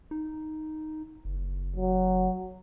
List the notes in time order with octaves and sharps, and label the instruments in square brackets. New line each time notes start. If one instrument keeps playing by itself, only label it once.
[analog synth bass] D#4
F#1
[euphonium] F#3